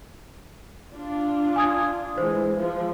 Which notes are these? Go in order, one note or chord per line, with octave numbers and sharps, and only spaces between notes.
D4 F4
G#5 D#6 G#6
E3 G#3 C5
F3